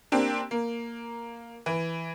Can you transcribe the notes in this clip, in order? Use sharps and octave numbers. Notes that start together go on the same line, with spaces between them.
A#3 C4 D4 G4
A#3
E3